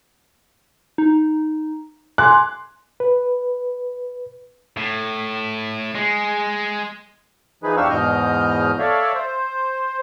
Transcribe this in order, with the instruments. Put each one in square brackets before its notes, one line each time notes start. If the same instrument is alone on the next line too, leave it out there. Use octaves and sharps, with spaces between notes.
[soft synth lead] D#4
[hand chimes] G#5 C6 [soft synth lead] D6 [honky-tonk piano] F#6
[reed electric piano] B4
[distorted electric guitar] A2
G#3
[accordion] E3 F3 D#4 G#4 B4
E2 D4 G4 F5 C#6 E6
E2 G#2 B2 D#5 F6 G6
A4 C#5 D5 E5 F5
C5